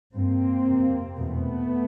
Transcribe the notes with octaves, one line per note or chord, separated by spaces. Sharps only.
G2 A#3 C4
F2 C3
E2 B2 A3 B3